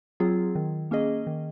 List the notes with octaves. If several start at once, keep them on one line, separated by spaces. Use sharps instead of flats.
F#3 C4 F4 G#4
D#3
A#3 C#4 G#4 D#5
D#3